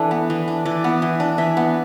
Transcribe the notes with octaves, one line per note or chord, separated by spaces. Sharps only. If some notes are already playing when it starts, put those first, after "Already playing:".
Already playing: E3 D4 A4
B3
E3
D4
E3 D5
B3
E3
D4
E3 E5
B3